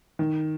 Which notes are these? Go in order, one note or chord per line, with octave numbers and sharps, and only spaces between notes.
D#3